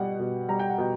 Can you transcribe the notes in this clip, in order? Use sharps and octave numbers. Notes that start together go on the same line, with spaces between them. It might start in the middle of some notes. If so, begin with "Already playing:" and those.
Already playing: B2 G3 F#5
B2
G3 A#5
G5
F#5
B2 G5